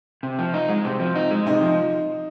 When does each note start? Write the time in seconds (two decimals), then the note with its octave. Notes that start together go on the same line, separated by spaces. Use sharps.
0.23 C3
0.39 F3
0.54 D#4
0.69 G#3
0.84 C3 C4
1.00 F3
1.15 D#4
1.31 G#3
1.46 C3 D#4
1.61 F3